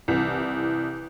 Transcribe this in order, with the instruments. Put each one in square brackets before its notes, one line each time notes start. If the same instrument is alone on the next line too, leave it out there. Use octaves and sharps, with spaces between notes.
[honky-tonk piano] C2 E3